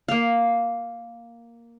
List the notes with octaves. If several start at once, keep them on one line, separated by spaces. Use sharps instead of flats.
A#3 F5